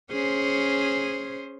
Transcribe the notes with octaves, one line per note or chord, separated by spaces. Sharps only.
C#4 G#4 C5